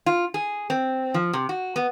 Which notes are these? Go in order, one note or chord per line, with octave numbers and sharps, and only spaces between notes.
F4
G#4
C4
F3
C3
F#4
B3